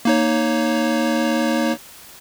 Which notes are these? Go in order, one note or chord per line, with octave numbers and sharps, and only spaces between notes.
A#3 D#4 C#5